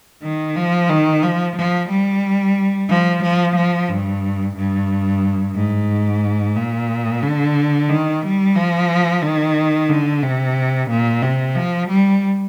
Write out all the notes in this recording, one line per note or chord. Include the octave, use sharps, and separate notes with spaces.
D#3
F3
D#3
F3
F3
G3
F3
F3
F3
G2
G2
G#2
A#2
D3
D#3
G3
F3
D#3
D3
C3
A#2
C3
F3
G3